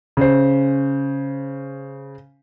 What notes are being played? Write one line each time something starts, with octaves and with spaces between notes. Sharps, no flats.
C#3 C5